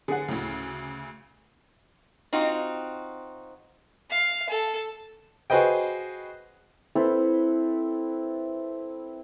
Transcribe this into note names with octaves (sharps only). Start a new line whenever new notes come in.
D3 G#4 F#5
D2 A2 C#3
C4 D#4 F4 F#4
F5
A4
F#4 G#4 B4 C5 D#5 G5
C4 E4 A4 B4